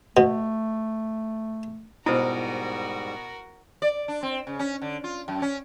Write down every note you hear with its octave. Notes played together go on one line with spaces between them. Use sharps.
B2 A3
G#2 B2 G3 E4 F#4 A#4 C5
D5
D4
C4
C#3
C#4
D3
F4
F#2
C#4